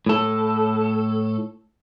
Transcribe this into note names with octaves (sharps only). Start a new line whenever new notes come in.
A2 A4